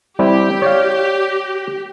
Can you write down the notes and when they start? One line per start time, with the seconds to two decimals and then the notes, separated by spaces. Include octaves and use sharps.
0.19 G3 C4 E4 G4
0.62 C#5 D5 F5